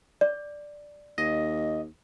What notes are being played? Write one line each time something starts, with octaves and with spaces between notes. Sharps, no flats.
D5
D#2 D#5